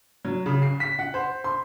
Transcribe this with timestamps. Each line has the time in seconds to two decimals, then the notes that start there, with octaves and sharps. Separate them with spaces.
0.25 F#3
0.46 C#3
0.62 C7
0.80 B6
0.99 F#5
1.14 C5
1.44 C6